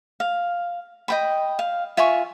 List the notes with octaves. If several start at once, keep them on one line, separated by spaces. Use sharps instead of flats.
F5
D#5 G5 B5
F5
F4 E5 G#5 C#6